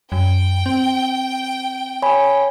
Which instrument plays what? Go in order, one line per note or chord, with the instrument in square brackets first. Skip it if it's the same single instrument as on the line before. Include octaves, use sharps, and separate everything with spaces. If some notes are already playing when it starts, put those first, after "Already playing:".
[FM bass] F#2 [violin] G5
[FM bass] C4
[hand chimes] C#5 G#5 B5